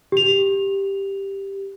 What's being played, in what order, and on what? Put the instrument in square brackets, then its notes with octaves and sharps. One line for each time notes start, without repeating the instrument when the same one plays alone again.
[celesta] G4 F7